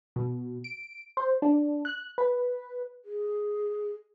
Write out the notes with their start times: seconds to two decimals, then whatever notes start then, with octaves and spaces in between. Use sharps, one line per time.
0.16 B2
0.64 D7
1.17 C5
1.42 D4
1.85 F#6
2.18 B4
3.05 G#4